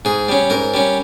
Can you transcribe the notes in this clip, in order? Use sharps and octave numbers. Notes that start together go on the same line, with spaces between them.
G#2 G#4
G3 C#4
G#2 A#4
G3 C#4